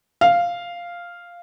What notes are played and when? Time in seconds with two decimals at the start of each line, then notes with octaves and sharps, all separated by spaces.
0.21 F5